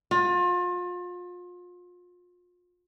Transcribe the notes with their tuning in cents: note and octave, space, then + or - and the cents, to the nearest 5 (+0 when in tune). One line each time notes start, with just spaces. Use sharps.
F4 +35